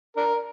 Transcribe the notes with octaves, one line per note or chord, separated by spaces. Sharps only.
D4 A#4